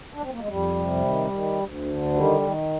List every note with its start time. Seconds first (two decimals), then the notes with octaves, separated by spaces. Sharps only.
0.14 D4
0.22 C4
0.31 A#3
0.40 G#3
0.48 F2 G3
0.76 C3
1.04 D#3
1.31 D#3
1.59 D2
1.86 D3
2.14 D#3 G3
2.41 D#3